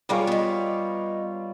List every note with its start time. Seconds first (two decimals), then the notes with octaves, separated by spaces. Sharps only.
0.09 G3 G#3 A#3 F4 G#4 C#5
0.27 B3 D#4